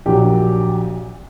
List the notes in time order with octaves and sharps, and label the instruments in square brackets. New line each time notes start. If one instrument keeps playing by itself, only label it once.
[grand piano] A#1 A#2 F#3 G4